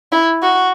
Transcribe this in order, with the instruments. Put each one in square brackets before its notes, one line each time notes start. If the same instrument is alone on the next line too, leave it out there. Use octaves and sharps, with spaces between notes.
[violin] E4
F#4